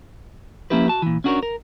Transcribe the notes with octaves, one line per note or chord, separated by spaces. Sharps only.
F3 A#3 C#4 E4 G4 B4
F#4 A5
A#2 E3
C#4 D4 F#4 G#4 A#4 C#5
A#4